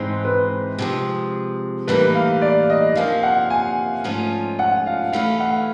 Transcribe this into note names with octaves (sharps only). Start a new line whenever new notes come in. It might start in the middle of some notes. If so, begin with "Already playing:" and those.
Already playing: G#2 E3 G#3 C4 D#4
B4
C3 F3 G#3
A2 E3 G3 A#3 D#4 B4
F5
D5
D#5
C3 F3 A#3 C#4 F5
F#5
G#5
G#2 F3 A3 C#4 F4
F#5
F5
E3 A3 C#4 E4 F5
F#5